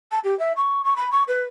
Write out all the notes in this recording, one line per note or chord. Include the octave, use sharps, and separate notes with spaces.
A5
G4
E5
C#6
C#6
B5
C#6
B4